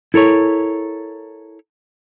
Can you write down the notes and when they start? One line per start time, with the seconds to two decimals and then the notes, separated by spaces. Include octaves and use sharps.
0.14 E4 A4 A#4 C#5